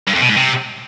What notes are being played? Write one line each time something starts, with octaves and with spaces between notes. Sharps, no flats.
G2
F2
B2
G#2
C3